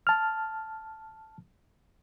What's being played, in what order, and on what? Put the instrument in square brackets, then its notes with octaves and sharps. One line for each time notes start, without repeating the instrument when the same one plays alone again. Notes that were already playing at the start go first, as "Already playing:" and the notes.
[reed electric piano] A5 F6